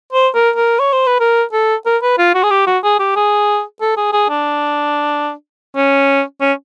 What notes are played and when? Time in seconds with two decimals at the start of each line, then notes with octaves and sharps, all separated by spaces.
0.13 C5
0.35 A#4
0.56 A#4
0.79 C#5
0.93 C5
1.07 B4
1.20 A#4
1.53 A4
1.86 A#4
2.02 B4
2.18 F4
2.35 F#4
2.44 G#4
2.51 G4
2.67 F#4
2.84 G#4
3.00 G4
3.16 G#4
3.81 A4
3.97 G#4
4.13 G#4
4.29 D4
5.76 C#4
6.41 C#4